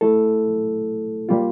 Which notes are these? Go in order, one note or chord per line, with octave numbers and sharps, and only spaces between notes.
A3 E4 A4
G3 A#3 F4